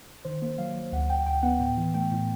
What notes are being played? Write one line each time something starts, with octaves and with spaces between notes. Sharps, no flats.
D#3 C5
A#3
F#3 F5
F#3
D2 F#5
D2 G5
D2 G5
B3 F#5
A2 G5
E3
A3 G5
A2